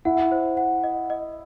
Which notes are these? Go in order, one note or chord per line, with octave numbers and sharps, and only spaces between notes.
E4 F#5
C5
F#5
D#5
D#5